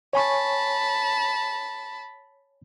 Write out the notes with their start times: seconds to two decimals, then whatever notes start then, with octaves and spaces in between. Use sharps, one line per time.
0.13 C#5 G#5 A5 B5 C#6